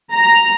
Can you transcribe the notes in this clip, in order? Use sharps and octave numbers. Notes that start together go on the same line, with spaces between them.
A#5